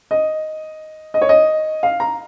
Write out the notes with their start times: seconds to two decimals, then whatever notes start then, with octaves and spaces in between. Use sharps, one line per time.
0.11 D#5
1.14 D#5
1.22 C#5
1.29 D#5
1.83 F5
2.00 A#5